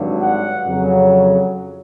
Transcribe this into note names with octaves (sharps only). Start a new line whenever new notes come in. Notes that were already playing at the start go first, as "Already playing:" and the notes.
Already playing: G#1 G2 D3 F#3
F#5
F2 C#3 F#3